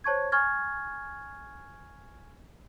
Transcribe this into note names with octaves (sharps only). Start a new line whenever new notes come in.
C5 C#5 A5 C#6 G#6
G#5 C#6 F6 G#6 A6